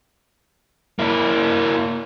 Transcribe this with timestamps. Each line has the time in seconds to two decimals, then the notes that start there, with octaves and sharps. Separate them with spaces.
0.99 A#3 E4